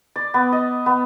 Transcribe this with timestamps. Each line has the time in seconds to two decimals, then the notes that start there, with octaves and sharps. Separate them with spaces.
0.16 D5
0.34 B3
0.52 D#5
0.86 B3